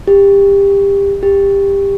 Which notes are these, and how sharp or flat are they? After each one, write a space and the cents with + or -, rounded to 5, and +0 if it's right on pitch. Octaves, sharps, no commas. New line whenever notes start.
G4 +20
G4 +15